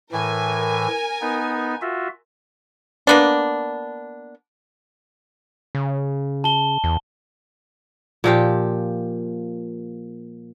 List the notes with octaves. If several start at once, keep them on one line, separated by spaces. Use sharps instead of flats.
A2 E3 A#4 G#5
B3 D#4
F4 F#4 E5
A#3 B3 D4
C#3
A5 G7
E2
A#2 F3 G4